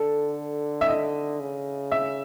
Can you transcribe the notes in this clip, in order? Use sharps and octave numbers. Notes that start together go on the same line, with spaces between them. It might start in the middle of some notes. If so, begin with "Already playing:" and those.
Already playing: D3 A4
E5
D#5
C#3
E5